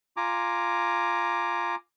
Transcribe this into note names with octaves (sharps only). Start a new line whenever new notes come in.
F4 G#5 A#5 D6